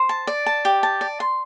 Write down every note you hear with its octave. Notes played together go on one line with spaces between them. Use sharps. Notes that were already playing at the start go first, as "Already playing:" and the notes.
Already playing: C5
A5
D5
A5
G4
A5
D5
C6